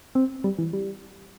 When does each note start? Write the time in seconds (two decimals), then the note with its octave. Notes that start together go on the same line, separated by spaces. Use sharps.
0.15 C4
0.44 G3
0.58 E3
0.73 G3